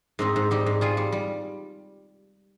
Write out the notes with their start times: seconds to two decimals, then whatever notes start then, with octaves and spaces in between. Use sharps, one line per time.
0.19 G#2 C4 D#4
0.36 G#2
0.51 G3 D#4 G4
0.66 G#2
0.81 G3 F4 G#4
0.97 G3
1.12 G3